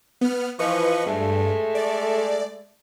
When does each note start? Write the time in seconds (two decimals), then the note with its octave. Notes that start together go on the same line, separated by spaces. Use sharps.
0.21 B3 F6
0.59 E3 F3 B4 D#5 C#6
1.06 G2 G#3 A3
1.75 D5